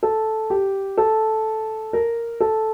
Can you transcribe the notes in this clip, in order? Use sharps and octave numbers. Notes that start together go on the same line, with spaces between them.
A4
G4
A4
A#4
A4